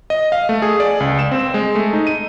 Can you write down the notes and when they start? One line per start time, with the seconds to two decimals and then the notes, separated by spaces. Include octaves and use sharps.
0.10 D#5
0.32 F5
0.49 A3
0.62 G#4
0.80 D5
1.00 C#2
1.19 E7
1.31 C4
1.54 G#3
1.75 A3
1.93 D#4
2.07 D#7